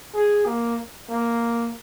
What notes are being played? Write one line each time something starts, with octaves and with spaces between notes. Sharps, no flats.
G#4
A#3
A#3